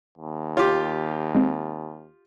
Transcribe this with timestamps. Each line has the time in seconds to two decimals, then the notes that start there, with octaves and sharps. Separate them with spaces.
0.18 D#2
0.57 F4 G4 C#5
1.35 G#3 C4